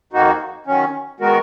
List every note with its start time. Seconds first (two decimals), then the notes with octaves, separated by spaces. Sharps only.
0.13 F2 D#3 A#3 D#4 F#4
0.66 D#3 F#3 C#4
1.20 D#3 G#3 B3 F#4 A#4